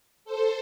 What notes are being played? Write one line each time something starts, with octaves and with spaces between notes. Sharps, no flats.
A4 C5